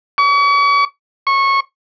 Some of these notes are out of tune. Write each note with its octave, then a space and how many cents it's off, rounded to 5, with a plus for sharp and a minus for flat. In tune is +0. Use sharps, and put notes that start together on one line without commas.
C#6 +40
C#6 -20